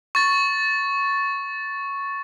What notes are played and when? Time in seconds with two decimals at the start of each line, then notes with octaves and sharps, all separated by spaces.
0.15 C#6 A6